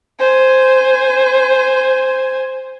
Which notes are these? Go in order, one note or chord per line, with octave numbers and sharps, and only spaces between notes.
C5 G#5